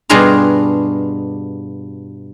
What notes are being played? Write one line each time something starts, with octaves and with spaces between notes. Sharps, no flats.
G2 B2 D4 F4 G#4 A#5